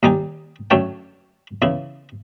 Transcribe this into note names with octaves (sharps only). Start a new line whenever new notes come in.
D#2 G3 D#4 G#5
F#2 D3 A3 C#5 G5
E2 C#3 E4